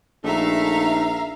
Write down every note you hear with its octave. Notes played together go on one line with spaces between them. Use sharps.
A#1 A3 D#4 E5 F5 A#5